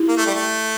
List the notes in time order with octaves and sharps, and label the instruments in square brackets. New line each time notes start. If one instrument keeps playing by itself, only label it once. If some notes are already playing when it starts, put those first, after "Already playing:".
Already playing: [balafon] E4 G4
[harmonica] A#3
A3
G3
A3